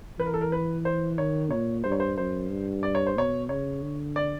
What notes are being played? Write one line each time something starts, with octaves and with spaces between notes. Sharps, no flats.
E3 B4
A#4
A4
A#4
B4
C5
D#3 C#5
A#2 C#5
G2 C5
C#5
C5
F#2 C5
G2
D5
C#5
C5
B2 C#5
C#3 C#5
D3
D5